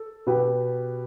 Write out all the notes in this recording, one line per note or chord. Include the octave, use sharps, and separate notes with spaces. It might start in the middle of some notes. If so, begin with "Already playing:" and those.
Already playing: A4
B2 G4 B4